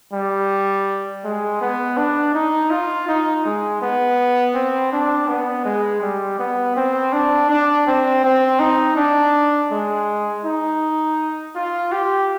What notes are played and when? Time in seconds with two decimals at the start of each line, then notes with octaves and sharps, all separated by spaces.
0.13 G3
1.24 G#3
1.61 B3
1.97 D4
2.34 D#4
2.71 F4
3.08 D#4
3.45 G#3
3.82 B3
4.54 C4
4.92 D4
5.28 B3
5.65 G#3
6.02 G3
6.39 B3
6.76 C4
7.12 D4
7.49 D4
7.86 C4
8.24 C4
8.59 D#4
8.96 D4
9.71 G#3
10.44 D#4
11.55 F4
11.92 G4